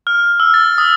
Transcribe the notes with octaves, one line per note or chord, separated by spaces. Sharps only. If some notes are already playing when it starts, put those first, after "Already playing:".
F6
E6
A6
D#6